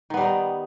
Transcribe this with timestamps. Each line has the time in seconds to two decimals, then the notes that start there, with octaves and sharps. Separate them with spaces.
0.10 D#3
0.14 B3
0.17 G3
0.21 D#4